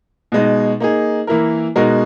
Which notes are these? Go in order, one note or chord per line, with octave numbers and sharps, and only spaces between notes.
B2 G#3 D#4
A#3 D#4 G#4
E3 A#3 E4 A#4
B2 G#3 D#4 F#4 A#4